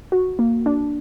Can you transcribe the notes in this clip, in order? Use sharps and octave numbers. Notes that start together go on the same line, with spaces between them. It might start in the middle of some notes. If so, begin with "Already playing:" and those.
F#4
A#3
D4